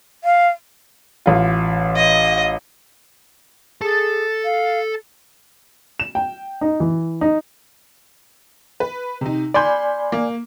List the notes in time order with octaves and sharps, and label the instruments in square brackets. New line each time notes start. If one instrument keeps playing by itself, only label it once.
[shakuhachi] F5
[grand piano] A1 F4
[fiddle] D#5
[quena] G#4 [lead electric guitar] A4 A5
[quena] F5
[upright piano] E7
G5
D#4
E3
D#4
[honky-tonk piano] B4
C3 D#4
[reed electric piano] D5 G#5 [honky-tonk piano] B5 C6 G6
[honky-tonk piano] A#3